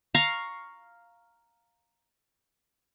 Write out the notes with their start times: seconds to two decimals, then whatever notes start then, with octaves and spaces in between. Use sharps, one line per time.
0.15 F5 A#5 C#6